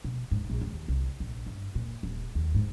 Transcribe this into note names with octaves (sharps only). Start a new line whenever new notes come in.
B2
G#2
A#1
D#2
C2
A#1
G2
A#2
D#1
D#2
G#2